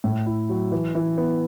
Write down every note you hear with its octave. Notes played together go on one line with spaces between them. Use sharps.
A2
E4
F#3
E3
E3
B3